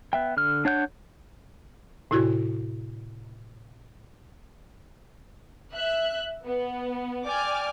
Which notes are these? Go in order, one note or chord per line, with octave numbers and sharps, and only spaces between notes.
B3 E5 G5
D3 F6
D4 C#5 F#5 G6
A2 C3 E4 F#4 G#6
E5 F#6
B3
D5 G5 G#5 D6 F6